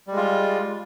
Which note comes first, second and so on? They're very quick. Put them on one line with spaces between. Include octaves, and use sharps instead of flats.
G3 G#3 F4